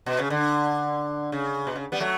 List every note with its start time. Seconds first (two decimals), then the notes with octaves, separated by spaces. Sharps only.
0.06 B2
0.19 C#3
0.30 D3
1.32 C#3
1.67 B2
1.76 C#3
1.92 G3 B3
2.00 F#3 A3